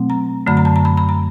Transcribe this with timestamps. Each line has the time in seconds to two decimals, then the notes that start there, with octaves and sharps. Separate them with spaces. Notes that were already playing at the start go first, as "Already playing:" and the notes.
Already playing: B2 F#3 A3 C4
0.10 A#5
0.47 F#2 D3 F#3 A3 B5
0.57 A#5
0.65 A5
0.76 A#5
0.85 B5
0.97 B5
1.09 A#5